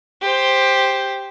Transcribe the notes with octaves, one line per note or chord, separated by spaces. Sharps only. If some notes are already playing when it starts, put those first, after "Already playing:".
G4 C5